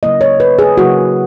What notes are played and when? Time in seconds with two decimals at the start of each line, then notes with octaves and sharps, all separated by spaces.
0.03 C#3 F#3 A#3 E4 D#5
0.21 C#5
0.40 B4
0.59 G#4
0.77 C#3 F#3 A#3 E4 F#4